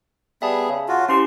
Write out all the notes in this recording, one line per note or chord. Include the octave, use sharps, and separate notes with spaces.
G3 B3 G#4 E5 A5
C#3
F4 F#4
C#4 E4 G4 C5 C6